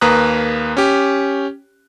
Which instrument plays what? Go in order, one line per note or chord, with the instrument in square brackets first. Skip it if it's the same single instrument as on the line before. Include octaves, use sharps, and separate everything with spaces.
[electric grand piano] D#2 A#3 B4 A#5 D#6 F#6
C#4 G4